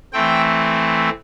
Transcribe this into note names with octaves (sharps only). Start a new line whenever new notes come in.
E3 A3 C4 G5